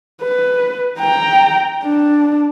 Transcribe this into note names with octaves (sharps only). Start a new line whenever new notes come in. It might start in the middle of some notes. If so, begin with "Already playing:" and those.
B4
G5 A#5
D4